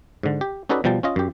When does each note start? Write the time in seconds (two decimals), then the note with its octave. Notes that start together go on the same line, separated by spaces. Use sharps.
0.23 G#2 D3
0.41 G4
0.69 C#4 D#4 F#4 A4 B4 D5
0.84 B2 F3 G3 G5 A5
1.03 C#4 F4 D#5
1.16 F#2 G4